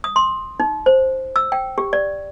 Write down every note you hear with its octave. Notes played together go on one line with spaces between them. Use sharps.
D#6
C6
D#4
C5
E6
G5
G4
D5